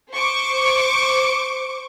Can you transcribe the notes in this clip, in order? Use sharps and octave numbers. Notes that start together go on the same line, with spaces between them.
C5 C#6 D6